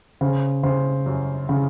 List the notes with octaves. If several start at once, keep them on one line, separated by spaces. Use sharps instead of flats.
C#3 C5
C#3 C5
F#2
C#3